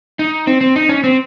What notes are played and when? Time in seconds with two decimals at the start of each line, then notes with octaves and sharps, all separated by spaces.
0.19 D#4
0.47 C4
0.61 C4
0.76 D#4
0.89 C#4
1.04 C4